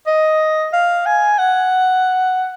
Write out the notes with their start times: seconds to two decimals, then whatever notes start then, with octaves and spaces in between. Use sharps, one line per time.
0.07 D#5
0.73 F5
1.06 G#5
1.38 F#5